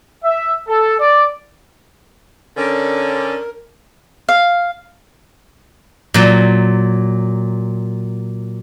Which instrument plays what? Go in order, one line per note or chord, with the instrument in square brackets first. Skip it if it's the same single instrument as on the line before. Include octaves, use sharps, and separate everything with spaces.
[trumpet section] E5
A4
D5
[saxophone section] D3 C#4 [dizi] A#4
[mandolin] F5
[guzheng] A#2 F#3